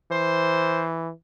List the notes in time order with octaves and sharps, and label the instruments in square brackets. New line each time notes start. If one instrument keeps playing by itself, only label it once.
[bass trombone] E3 [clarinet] C5